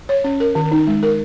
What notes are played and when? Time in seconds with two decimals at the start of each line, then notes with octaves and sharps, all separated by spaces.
0.09 C#5
0.24 C#4
0.40 A#4
0.55 D#3
0.71 D#4
0.87 G#3
1.03 A#4